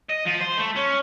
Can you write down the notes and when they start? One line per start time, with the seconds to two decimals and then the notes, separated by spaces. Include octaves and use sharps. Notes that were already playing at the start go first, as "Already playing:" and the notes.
0.09 D#5
0.26 F3
0.40 C5
0.58 A3
0.75 C#4